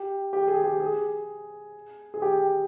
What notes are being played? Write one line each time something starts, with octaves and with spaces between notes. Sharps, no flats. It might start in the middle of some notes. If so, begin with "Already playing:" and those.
Already playing: G4
G4
G#4
G4
G#4
G#4
G4